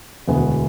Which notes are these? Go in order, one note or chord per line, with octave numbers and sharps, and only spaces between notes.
E1 D2 D3 G#3 B3